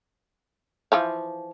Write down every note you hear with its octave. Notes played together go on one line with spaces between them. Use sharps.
E3 F3 F5